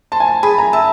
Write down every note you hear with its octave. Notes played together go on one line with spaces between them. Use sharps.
C5 A5
G#5
A5
G#4 B5
A#5
E5 A5